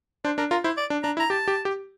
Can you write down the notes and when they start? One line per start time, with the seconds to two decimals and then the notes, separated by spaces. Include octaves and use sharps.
0.25 D4 C5
0.38 D4 A#4
0.51 F4 A#4
0.64 E4 C5
0.77 D5
0.90 D4
1.03 D4 A#5
1.17 E4
1.20 A#5
1.30 G4 A5
1.48 G4
1.65 G4